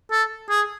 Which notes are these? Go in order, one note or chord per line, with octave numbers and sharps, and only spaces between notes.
A4
G#4